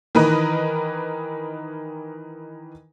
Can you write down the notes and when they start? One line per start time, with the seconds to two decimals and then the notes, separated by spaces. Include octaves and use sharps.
0.15 D#3 E3 A#4 B4 D#5